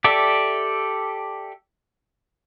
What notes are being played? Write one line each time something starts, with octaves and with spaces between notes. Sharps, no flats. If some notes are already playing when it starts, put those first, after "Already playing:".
G4 A4 D5 E5